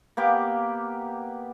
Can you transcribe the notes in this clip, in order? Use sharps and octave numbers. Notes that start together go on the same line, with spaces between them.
A#3 B3 G4 D6